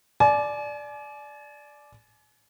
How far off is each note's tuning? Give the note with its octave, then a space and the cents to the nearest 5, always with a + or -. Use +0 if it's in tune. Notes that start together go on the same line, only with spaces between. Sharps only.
D5 +0 G#5 +40